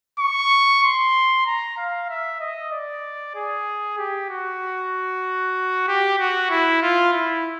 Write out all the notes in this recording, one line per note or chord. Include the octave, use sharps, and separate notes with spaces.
C#6
C6
A#5
F5
E5
D#5
D5
G#4
G4
F#4
G4
F#4
E4
F4
E4